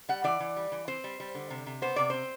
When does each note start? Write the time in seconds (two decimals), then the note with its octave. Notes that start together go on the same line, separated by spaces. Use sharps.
0.09 G3 F#5
0.24 E3 D5
0.40 E3
0.56 G3
0.72 E3
0.88 C4 C5
1.04 G3
1.20 G3
1.35 D3
1.50 C3
1.66 C3
1.82 B3 C5
1.96 C3 D5
2.10 C4 C5